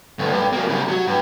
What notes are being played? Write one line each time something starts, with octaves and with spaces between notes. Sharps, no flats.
D2 G2
G2
F#3 A#3
C#3 G3
F#3 F#4
G2